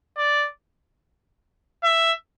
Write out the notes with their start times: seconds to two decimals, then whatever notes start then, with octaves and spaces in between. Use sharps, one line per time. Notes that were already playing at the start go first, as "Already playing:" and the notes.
0.18 D5
1.84 E5